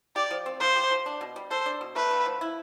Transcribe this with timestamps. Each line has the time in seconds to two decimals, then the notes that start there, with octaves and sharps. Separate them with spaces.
0.16 G4 D5
0.31 F3
0.46 C4
0.60 F3 C5
0.76 G4
0.91 F3
1.06 D4
1.21 B2
1.36 G3
1.51 A4 C5
1.66 D4
1.81 B2
1.96 A3 B4
2.11 D3
2.26 F3
2.41 E4